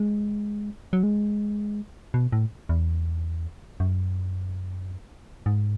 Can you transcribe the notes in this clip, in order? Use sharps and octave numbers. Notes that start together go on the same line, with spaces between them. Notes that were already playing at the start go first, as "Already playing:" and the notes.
Already playing: G#3
F#3
G#3
B2
A2
E2
F#2
G#2